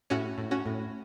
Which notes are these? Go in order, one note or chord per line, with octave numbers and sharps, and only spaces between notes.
A2 C#4 F#4
A2
C#4 F#4
A2